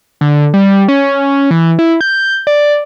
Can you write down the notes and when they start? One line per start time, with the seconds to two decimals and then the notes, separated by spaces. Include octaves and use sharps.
0.21 D3
0.54 G3
0.88 C#4
1.51 E3
1.79 E4
2.01 G6
2.47 D5